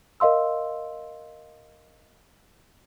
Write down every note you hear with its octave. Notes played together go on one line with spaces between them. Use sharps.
A#4 D#5 F5 C6 E6